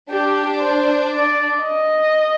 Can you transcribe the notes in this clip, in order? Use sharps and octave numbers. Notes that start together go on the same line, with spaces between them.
D4 G4
C5
D5
D#5